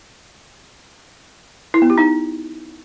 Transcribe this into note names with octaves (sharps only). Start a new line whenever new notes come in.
E4
B3
G4
D#4